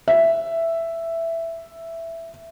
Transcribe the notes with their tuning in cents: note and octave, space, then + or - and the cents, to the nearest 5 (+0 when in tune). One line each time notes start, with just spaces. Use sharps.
E5 +5